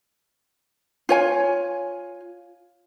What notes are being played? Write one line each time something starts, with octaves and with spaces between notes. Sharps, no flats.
F4 C#5 G#5